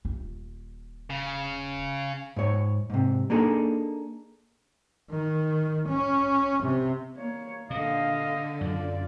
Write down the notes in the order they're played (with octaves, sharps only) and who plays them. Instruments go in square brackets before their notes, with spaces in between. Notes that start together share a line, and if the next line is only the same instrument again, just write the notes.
[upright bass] D#1
[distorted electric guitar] C#3
[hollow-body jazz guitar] G#2 C#5
G#2 C3
A#3 D4 D#4 G#4 A4
[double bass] D#3
C#4
C3
[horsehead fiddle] A#3 C#5
[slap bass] A#2 [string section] D3 [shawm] D#5 [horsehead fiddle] F5
[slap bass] F#2 F#3 [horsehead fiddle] F4 D5